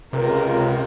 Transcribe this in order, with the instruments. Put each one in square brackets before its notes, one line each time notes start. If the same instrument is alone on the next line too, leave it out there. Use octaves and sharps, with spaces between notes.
[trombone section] C#2 [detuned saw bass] C3 [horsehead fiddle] A#4